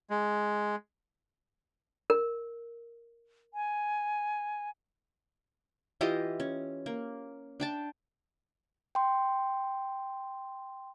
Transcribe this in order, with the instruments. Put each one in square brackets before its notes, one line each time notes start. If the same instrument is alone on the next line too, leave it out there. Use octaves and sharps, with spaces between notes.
[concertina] G#3
[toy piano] A#4
[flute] G#5
[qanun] E3 F4 G4 D#5
C#4
A#3
D4 G5 A5
[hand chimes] G5 C6